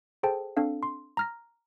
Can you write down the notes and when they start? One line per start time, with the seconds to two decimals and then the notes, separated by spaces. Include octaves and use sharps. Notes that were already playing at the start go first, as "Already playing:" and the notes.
0.23 G#4 A4 C5 G5 A5
0.57 C4 D4 A4 F5
0.83 C6
1.17 A#5 F6 A#6